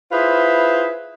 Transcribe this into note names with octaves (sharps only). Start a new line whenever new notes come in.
E4 F4 G#4 B4 C5 E5